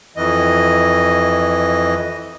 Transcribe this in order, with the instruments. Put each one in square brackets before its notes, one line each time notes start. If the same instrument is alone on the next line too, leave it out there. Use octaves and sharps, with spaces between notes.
[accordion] F2 E3 D#5